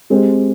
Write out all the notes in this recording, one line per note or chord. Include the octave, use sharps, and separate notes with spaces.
G#3 C4 G4